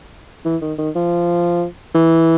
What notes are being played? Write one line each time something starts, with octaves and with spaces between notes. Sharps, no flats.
E3
D#3
D#3
F3
E3